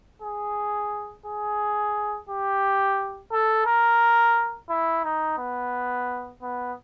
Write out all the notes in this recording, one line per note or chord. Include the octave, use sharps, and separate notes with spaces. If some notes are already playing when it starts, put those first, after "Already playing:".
G#4
G#4
G4
A4
A#4
E4
D#4
B3
B3